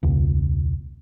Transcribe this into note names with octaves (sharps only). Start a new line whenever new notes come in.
E1 C#2